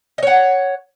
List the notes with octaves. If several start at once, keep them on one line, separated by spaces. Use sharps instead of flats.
C#5 D#5 F#5